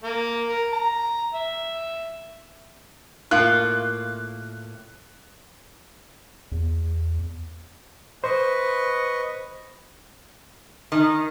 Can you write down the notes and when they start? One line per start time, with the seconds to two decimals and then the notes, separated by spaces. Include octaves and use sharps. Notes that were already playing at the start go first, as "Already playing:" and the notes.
0.03 A#3
0.48 A#4
0.73 A#5
1.34 E5
3.31 A2 A#3 F4 F#6
6.52 E2
8.24 B4 C5 D#5 C#6
10.92 D#3